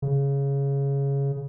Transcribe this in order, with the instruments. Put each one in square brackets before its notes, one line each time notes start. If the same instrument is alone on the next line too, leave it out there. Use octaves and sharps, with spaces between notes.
[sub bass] C#3